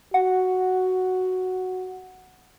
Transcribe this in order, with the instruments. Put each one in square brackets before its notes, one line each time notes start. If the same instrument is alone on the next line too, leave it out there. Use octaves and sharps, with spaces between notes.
[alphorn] F#4 [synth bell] F#5